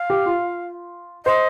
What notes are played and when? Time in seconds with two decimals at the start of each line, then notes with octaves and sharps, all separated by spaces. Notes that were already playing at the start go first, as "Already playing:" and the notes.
Already playing: F5
0.10 G4
0.26 F4
1.25 C5 D#5